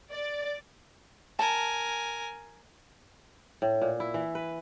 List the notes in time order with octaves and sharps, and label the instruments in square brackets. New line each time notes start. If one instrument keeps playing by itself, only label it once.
[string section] D5
[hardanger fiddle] A#4 G#5 [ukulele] A5
[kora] A2
A#2
E4
E3
B4